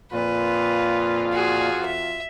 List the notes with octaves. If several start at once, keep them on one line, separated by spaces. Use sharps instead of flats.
F2 A#2 F4 B4
F#4 G#4
E5